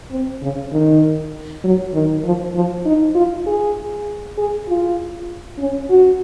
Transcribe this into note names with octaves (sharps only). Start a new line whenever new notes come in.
C4
C#3
D#3
F#3
D#3
F3
F3
D#4
F4
G#4
G#4
F4
C#4
F#4